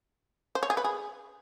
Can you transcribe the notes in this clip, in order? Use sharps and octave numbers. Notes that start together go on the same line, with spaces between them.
C5
C#5
G#4
B4
G#4